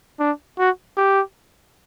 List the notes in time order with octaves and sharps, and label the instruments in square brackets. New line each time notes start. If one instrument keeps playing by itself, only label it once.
[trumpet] D4
F#4
G4